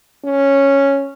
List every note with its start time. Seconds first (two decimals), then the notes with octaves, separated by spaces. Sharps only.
0.25 C#4